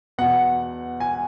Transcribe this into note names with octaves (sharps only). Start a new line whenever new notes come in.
E2 B2 F#5
G#5